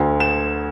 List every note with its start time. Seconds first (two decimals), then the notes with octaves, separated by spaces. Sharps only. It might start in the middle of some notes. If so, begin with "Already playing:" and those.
Already playing: D2 D3
0.20 E7